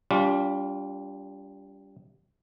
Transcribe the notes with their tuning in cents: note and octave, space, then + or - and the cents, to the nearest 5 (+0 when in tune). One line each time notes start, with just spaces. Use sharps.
G3 +0 D4 -45 F4 +0